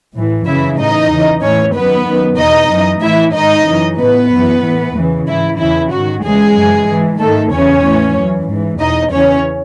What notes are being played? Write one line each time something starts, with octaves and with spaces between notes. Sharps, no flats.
A2 E3
F#2 C#3 E3 E4 E5
A2 E3 D#4 D#5
E2 C#3 E3
A2 E3 C#4 C#5
F#2 D#3 B3 B4
F#2 D#3
E2 B2 D#4 D#5
F#2 E3
A2 E3 E4 E5
G#2 D#3 D#4 D#5
F#2 C#3 E3
A2 E3 B3 B4
F#2 E3
A2 E3
E2 C#3 E3
G#2 E3 E4
E2 C#3 E3 E4
G#2 D#3 F#4
E2 C#3 E3 G#3 G#4
F#2 E3
G#2 E3
G#2 D#3 A3 A4
E2 C#3 E3 C#4 C#5
A2 E3
F#2 E3
G#2 E3
E2 B2 D#4 D#5
E2 C#3 E3 C#4 C#5